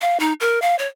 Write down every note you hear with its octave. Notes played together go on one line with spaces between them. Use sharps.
F5
D#4
A#4
F5
C#5